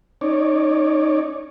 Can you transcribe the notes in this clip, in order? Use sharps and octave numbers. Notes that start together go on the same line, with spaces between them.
C#4 D#4 C#5 D5